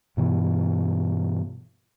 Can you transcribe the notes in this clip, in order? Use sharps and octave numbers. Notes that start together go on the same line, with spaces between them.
G2 B2 E3